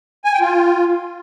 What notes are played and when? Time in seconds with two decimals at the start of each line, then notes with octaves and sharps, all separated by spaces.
0.25 G#5
0.33 G5
0.41 F4